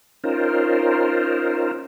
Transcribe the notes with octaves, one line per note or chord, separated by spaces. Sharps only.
C#4 D#4 F4 A#4 C5